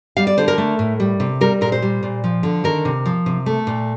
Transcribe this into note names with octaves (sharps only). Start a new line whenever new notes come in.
G3 F5
D5
D3 C5
A#4
A3
A2
G3
C3
G3 A#4
A#2 A#4
C5
G3
A#2
F3
D3
D#3 A#4
C3
F3
C3
A3
A#2